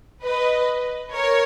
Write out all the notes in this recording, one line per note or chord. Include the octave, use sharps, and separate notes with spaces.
B4 D#5
A#4 C#5